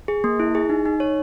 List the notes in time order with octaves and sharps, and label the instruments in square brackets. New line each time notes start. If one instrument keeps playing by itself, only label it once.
[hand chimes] G#4
A#3
E4
G#4
D#4
D#4
C#5